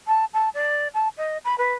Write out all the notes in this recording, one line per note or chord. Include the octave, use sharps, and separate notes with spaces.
A5
A5
D5
A5
D#5
B5
B4